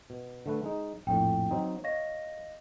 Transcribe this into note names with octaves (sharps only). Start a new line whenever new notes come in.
B2
D3 A3 B4
G#3 D#4
A#1 F2 A2 G5
F#3 C4 D#4
C#5 D#5 F5 A#6